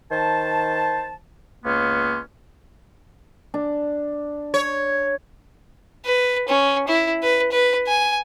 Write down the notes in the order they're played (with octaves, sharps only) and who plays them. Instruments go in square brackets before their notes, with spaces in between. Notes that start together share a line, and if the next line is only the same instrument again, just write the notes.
[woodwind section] D#3 C5 A5
C#2 A#3 B3 C#4 C6
[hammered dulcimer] D4
[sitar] C#5
[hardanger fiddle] B4
C#4
E4
B4
B4
G#5